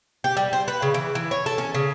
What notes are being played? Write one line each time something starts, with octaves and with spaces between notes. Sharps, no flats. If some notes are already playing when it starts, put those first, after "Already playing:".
G4
G3
C5
B4
C#3
E3
E3
C#5
A4
C#4
C#3